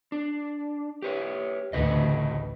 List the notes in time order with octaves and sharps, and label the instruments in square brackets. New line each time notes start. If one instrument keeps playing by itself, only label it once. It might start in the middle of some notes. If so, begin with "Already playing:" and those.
[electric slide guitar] D4
G4 B4 C#5
[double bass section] A1 D2 [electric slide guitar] C#3 B4 D#5